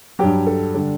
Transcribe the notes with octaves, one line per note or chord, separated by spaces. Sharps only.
G2 F#3 G4
A4
D3 G3